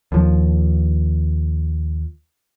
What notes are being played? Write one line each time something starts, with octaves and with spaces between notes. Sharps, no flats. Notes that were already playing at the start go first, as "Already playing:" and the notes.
D#2 F3